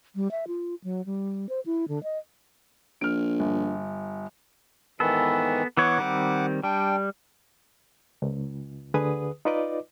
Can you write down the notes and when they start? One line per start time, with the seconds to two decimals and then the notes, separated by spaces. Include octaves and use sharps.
0.15 G3
0.31 E5
0.47 F4
0.84 F#3
1.06 G3
1.49 C5
1.66 E4
1.88 D3
2.03 D#5
3.01 A#1 F6 D7
3.39 G1
5.00 G#2 D#3 E3 B3 A4
5.77 E3 B3 C#5 F#5 D6
5.98 D#3 G3 C4
6.63 G3 D4 G5
8.22 C#2
8.94 D2 D3 G#4 B4 D#6
9.45 D#4 F4 B4 D5 D#5 D6